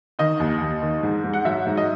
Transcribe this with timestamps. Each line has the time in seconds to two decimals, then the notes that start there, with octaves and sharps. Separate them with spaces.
0.19 D#3 D#5
0.40 D#2
0.61 D#2
0.82 D#3
1.03 G#2
1.24 G#2
1.33 F#5
1.45 F#3 E5
1.67 G#2
1.77 D#5